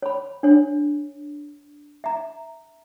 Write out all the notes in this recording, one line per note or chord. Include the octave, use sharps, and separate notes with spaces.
C#5 B5
D4 C#5
E5 A#5